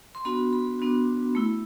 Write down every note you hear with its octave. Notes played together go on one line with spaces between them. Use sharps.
C6
B3 D4 F#4 B5
B5
B3 D4 F#4
A3 E4